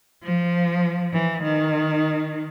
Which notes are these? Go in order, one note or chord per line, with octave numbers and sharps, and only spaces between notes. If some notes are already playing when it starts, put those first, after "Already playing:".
F3
E3
D#3